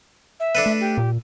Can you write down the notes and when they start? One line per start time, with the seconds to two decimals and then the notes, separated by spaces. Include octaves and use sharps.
0.40 E5
0.55 D4 A4 B4
0.66 A3
0.80 G4
0.98 A#2